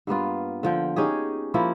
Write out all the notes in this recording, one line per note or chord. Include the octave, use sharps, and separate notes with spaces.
G2 A#3 B3 F4
D3 F3 G5
C#4 D#4 G4 G#4
F3 A#3 E4